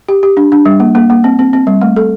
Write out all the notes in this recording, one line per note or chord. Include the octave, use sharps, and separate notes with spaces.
G4
G4
D4
D4
G3
A#3
A#3
A#3
C4
C4
C4
G3
A3
A4